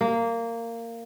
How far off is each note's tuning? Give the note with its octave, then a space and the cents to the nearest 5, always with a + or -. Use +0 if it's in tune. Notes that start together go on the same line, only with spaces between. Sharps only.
A#3 -15